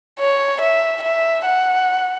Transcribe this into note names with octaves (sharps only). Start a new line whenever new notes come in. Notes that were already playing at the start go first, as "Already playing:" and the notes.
C#5
E5
E5
F#5